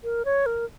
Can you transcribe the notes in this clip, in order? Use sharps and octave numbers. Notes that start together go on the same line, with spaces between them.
A#4
C#5
A#4